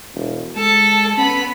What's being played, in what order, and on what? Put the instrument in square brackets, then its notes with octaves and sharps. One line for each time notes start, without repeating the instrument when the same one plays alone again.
[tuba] E1
[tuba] G#3 [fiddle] A4 A5
[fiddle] B3 B5 [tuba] C#4